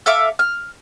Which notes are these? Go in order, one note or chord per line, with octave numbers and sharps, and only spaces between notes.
A4 E5 F5 D6
F6